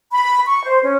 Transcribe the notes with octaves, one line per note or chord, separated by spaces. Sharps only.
B5
C#6
C5
C#4